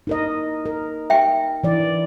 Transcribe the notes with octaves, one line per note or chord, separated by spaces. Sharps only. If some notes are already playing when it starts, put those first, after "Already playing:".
D#4 A#4 D#5
A#4
E5 G5
E3 D5